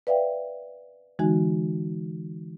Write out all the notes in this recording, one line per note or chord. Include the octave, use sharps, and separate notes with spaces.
B4 D5 E5 F5 G5
D3 E3 G#3 D#4 F#4 G#5